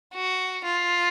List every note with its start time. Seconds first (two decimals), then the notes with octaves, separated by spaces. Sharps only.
0.15 F#4
0.64 F4